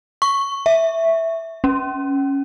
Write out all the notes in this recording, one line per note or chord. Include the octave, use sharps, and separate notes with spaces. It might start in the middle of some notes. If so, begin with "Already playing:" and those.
C#6
E5
C#4